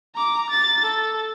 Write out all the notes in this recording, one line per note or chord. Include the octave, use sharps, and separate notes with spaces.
A#5 D6
A6
A4